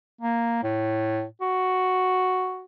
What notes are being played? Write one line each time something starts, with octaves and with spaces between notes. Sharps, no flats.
A#3
A2
F#4